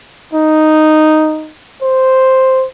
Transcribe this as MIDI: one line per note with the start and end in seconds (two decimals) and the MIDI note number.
0.33 1.52 63
1.82 2.65 72